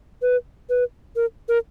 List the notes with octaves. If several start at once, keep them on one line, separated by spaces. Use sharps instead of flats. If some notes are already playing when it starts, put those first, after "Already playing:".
B4
B4
A#4
A#4